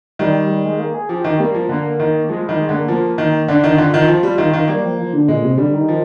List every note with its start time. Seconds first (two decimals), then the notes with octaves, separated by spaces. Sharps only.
0.19 D#3 G3
0.50 G3
0.65 G#3
0.79 A#3
0.94 G#4
1.09 F3 G4
1.24 D#3
1.40 G3 A#3
1.54 F3
1.69 D3 A#3
2.00 D#3
2.29 F3 G#3
2.44 D#3 G3
2.59 G#3
2.69 D3 A#3
2.88 F3 A#3
3.18 D#3
3.48 D3 D4
3.64 D#3
3.78 D3 F4
3.94 D#3
4.08 F3
4.23 G3
4.38 D#3
4.53 D#3
4.68 G3 A#3
4.83 F3
4.99 F3
5.13 D3
5.28 A#2 G#3
5.44 C3
5.57 D3 G3
5.74 D#3
5.88 F3